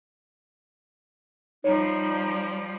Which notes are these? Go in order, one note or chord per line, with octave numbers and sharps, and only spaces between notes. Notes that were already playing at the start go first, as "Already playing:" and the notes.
F3 G3 D#4 C#5